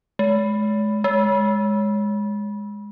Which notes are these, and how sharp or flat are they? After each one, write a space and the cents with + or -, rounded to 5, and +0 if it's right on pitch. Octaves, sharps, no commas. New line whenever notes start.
G#3 +30
G#3 -5